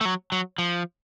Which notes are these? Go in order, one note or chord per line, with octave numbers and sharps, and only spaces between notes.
A3
F#3
F#3
F3